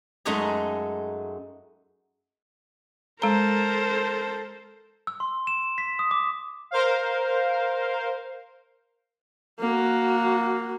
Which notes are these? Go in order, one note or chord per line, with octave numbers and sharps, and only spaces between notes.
F#2 G#3 A3 D#4 D#5 A#5
G#3 A4 A#4 C5 A#5
E6
C6
E7
B6
D#6
D6
A#4 C5 F5
A#3 F#4